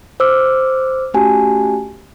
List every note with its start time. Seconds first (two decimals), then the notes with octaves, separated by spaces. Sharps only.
0.20 C5 D6 E6 F6
1.14 A3 C#4 F#4 G4 G#5 A5